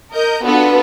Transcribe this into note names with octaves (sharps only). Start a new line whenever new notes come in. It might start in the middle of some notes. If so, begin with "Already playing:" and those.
A#4 D#5 G6
B3 D4 F4 F#4 A4 B4